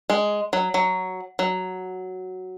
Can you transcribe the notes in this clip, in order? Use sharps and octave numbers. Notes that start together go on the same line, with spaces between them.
G#3
F#3
F#3
F#3